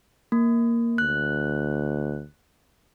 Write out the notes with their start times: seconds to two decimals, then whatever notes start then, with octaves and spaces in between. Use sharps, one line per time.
0.32 A#3
0.98 D2 F#6